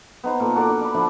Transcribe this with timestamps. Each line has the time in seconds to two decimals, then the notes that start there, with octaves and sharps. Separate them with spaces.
0.24 B3 D#4 C5
0.40 A#2 F4 A4 A#4
0.56 F#4 A4 A#4 D5
0.69 D4
0.81 D5 B5
0.94 D3 F3 D4 E4